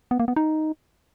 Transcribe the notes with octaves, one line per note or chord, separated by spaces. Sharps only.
B3
A#3
B3
D#4